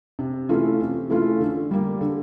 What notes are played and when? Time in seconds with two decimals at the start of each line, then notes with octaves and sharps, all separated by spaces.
0.19 C3
0.49 E3 A3 C#4 F4
0.80 C3
1.10 E3 A3 C#4 F4
1.40 D3
1.71 G3 A#3
2.01 D3